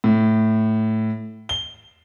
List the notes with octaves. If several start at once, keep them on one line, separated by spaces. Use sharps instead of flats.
A2
G7